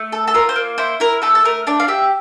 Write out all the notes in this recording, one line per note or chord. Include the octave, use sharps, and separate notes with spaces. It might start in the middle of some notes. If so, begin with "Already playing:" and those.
Already playing: A3
A4
A4
F4 A#4
C5
A#3
E4 C5
E4 A#4
A3 A4
A4
A3 A#4
D4 D5
F5
G4 E5